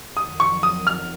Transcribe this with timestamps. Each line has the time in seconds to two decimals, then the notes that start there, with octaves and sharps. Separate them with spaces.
0.17 F2 D#3 F#3 D#6
0.40 C#6
0.63 D#6
0.87 F6